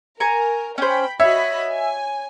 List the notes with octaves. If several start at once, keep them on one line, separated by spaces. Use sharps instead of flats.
A#4 G#5 A#5 C#6
C#4 C5 G5 B5
F#4 C#5 D#5 E5 B5
G#5